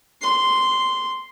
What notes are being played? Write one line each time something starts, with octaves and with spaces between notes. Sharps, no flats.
C6